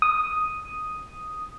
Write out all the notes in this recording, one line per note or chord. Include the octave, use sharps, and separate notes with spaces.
D#6